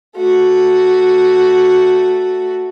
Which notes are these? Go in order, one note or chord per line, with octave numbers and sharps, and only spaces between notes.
A3 F#4